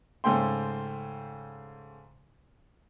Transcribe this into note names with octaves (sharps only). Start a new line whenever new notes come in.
G#2 C#3 A3 G5 C6